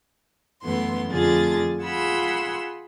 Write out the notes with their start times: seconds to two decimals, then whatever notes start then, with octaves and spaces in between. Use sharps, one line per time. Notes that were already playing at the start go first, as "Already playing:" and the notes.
0.63 F#2 E3 A3 B3 C6
1.09 F2 D3 A3 F4 G#4 A6
1.83 F4 G#4 F#5 B5 C6 E6